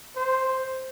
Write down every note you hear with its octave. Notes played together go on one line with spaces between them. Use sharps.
C5